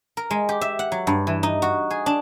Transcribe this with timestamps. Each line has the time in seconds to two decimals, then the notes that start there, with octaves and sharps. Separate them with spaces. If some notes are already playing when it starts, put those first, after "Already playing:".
0.17 A#4
0.31 G#3
0.49 G4
0.61 E5
0.79 F#5
0.92 F#3
1.07 G2
1.27 E3
1.43 D#4
1.62 F#4
1.91 G#4
2.06 D4